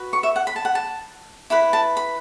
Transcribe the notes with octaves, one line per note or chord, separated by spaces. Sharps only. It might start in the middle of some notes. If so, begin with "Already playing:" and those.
Already playing: F#4 B4
C#6
E5
F#5
B5
A5
F#5
A5
E4 B4 B5
A5
B5